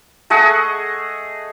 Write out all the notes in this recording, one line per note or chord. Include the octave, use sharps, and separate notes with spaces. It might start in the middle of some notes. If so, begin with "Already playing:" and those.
A3 G#4 D#5 F#5